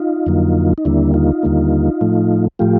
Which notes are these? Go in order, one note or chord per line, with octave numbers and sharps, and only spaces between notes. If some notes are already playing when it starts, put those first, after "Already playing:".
Already playing: D#4 F4
F2 D3 F#3 A#3
D#4
D#2 D3 G3 A#3 D4 E4
D#4 F4
D#2 D3 G3 A#3
A2 F3 A3
A2 F3 A3 F4 G4